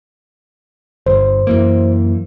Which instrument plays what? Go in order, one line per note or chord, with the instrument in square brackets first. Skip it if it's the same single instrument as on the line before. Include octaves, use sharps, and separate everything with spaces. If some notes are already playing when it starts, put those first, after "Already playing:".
[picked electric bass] G1 [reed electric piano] C5
[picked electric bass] F#2 E3 A#3